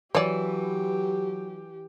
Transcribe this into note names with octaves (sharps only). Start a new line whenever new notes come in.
E3 F#3 G4 C#5 D5